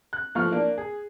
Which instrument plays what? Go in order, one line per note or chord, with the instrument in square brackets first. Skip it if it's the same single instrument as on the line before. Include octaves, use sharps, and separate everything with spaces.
[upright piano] F#6
E3 F3 A3 F4 C#6 F6
A#3 D4
G#4